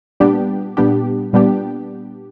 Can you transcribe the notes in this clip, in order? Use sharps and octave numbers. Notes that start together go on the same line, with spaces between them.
A#2 G3 B3 D4 G4
A#2 G3 B3 D4 G4
A#2 G3 B3 D4 G4